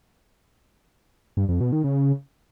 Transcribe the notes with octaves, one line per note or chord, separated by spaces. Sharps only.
G2
F2
B2
D#3
C#3